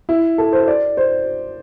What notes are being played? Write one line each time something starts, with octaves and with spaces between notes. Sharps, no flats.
E4
A4
C5
D5
C5